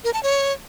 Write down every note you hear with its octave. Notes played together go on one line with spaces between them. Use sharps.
A#4
A5
C#5